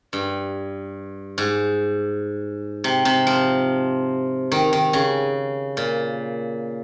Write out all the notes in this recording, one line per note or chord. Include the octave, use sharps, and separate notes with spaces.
G2
G#2
C3
C3
F3
D#3
D#3
C#3
A#2